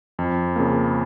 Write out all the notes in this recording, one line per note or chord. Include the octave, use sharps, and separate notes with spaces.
F2
C#3 A#3